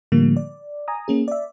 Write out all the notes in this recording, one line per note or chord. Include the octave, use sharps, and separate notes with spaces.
A2 D3 F3 G3 A#3
D5
G#5 A#5 D#6
A#3 C#4 G#4
D5 E5